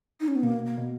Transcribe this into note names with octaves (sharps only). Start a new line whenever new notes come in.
D#4
C#4
B3
B2 A#3
A#3
B2